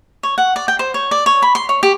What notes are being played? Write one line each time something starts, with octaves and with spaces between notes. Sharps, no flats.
C#5
F#5
D5
G5
C5
C#5
D5
C#5
B5
C6
C#5
G4